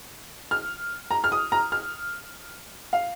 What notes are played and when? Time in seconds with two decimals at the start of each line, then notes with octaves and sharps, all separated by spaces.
0.51 F6
1.11 A#5
1.24 F6
1.32 D#6
1.52 A#5
1.72 F6
2.93 F5